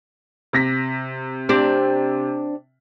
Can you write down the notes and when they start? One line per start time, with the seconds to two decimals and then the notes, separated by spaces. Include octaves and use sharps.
0.53 C3 A#6 B6
1.49 C4 D4 G4